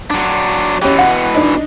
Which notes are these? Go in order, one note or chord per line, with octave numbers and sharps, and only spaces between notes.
F#3 D4
B2 E3 C#4 G4
F#5
D4 D#4